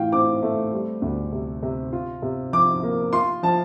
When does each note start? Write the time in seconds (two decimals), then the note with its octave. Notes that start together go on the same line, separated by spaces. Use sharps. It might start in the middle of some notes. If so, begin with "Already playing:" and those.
Already playing: A2 E3 F5 G5
0.12 C4 D6
0.43 A3
0.73 G3
1.02 D2
1.33 C3
1.63 C3
1.93 F4
2.22 C3
2.53 F3 D6
2.83 A#3
3.13 F4 C6
3.43 F3 A5